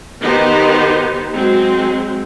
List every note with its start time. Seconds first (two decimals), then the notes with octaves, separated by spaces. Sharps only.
0.21 D#3 B3 D#4 G4 C5
1.34 F#3 G#3 C4